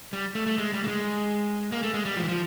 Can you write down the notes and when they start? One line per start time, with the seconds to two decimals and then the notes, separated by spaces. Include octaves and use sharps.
0.13 G3
0.35 A3
0.46 A3
0.58 G#3
0.73 G3
0.84 A3
0.88 G#3
1.72 A#3
1.83 A3
1.94 G#3
2.05 G3
2.16 F3
2.23 E3
2.28 F3